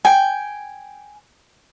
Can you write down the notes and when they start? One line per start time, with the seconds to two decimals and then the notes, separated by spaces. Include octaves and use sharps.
0.05 G5 G#5